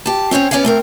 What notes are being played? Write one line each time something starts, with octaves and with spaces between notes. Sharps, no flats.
G4 A5
C4 C#4 C5 C#5
B3 C#4 C#5 D5 F5 G#5
A3 C4 A#4